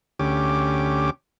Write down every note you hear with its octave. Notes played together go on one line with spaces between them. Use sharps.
D2 C#4 G4 D6